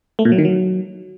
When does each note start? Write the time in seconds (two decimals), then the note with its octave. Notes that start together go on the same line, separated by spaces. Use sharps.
0.19 A3
0.25 A#2
0.32 F#3
0.38 D#3
0.45 F#3